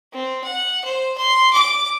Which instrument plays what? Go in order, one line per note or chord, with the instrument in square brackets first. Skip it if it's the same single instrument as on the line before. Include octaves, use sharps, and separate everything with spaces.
[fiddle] C4
F#5
C5
C6
D6